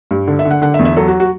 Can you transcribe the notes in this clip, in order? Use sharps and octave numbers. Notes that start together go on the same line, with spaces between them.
G2
D3
E5
D3
F#5
D3 F#5
E5
E2
E5
F#3 A4
F#4
F#4